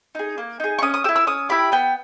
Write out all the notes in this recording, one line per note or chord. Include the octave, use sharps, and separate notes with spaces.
D#4 G#4
A#3
D#4 G#4
C#6
C#4 D#6
D#6
G4 E6
E4
E6
C#4 D#6
E4 G4 B5
B3 G5